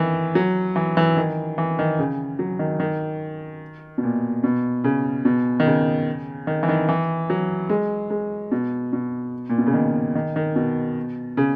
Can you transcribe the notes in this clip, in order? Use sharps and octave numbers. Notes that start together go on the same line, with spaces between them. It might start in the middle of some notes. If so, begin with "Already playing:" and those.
Already playing: D#3 E3
F#3
E3
E3
D#3
E3
D#3
C#3
F#3
D#3
D#3
B2
A#2
B2
C#3
B2
D#3
C#3
D#3
E3
D#3
E3
F#3
G#3
G#3
B2
B2
A#2
B2
C#3
D#3
D#3
D#3
B2
C#3